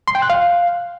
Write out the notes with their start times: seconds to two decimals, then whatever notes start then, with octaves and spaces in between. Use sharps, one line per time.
0.08 C6
0.15 G5
0.22 F#6
0.30 F5